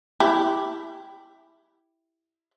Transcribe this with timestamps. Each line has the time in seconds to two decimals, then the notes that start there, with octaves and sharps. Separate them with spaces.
0.20 E4 G4